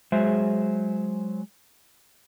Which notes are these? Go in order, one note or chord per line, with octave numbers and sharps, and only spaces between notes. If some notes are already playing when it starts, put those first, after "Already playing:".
F#3 G#3 G#4 C5 E5